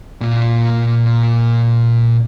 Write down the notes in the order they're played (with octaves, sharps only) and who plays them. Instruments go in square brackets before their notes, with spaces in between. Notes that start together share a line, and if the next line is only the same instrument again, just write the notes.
[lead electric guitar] A#2 F4